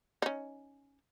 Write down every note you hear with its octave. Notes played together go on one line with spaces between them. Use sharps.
C#4 D#4